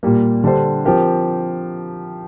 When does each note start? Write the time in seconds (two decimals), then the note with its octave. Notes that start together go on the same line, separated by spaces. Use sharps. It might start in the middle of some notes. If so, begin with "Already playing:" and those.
0.03 A#2 G3 A#3
0.44 D3 G3 D4 A4 C5
0.85 F3 C4 G4 A#4